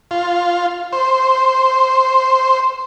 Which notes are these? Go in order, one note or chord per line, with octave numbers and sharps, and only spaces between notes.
F4
C5